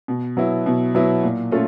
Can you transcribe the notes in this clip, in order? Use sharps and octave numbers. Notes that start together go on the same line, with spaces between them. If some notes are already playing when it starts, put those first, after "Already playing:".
B2
F#3 B3 E4
B2
F#3 B3 E4
A#2
A3 C#4 F4